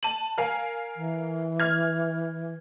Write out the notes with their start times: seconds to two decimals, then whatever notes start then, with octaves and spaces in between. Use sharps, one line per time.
0.03 A5 D#7 F#7
0.38 A#4 F5 G#5
0.96 E3
1.60 F6 G#6